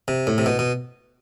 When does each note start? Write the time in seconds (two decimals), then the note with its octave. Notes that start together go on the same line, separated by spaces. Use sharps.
0.08 C3
0.27 A2
0.38 C3
0.46 B2
0.59 B2